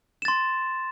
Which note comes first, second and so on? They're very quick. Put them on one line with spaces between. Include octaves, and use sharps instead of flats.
E7 A6 C6